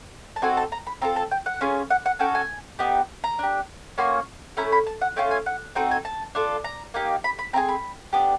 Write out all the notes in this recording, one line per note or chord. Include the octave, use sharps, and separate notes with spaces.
A5
C4 D#4 F#4 A4 G#5
A5
A#5
B5
C4 F4 A4 A#5
A5
G5
F#5
C#4 F4 G#4
F#5
F#5
C#4 F#4 A4 G5
G#5
B3 D#4 G4
A#5
D4 G4
A#3 C#4 F#4 C6
A3 C#4 E4 A#5
B5
A5
F#5
A3 C#4 F4 G5
G#5
F#5
C4 D#4 F#4 A4 G5
G#5
A5
D4 F4 A4
A#5
A#3 D#4 G4
B5
B5
C4 E4 G#4 A#5
B5
B3 D4 G4